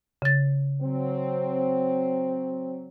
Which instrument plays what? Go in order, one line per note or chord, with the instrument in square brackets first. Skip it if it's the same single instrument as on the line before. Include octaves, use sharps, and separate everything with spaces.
[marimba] C#3 A6
[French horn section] F#3 C4